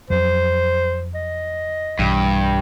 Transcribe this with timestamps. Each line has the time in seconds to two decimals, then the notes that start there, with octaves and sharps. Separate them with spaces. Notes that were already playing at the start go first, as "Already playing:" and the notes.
0.10 F2 F#3 C5
1.14 D#5
1.99 B1 G2 E3